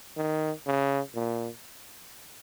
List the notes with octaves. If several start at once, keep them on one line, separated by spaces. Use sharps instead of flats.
D#3
C#3
A#2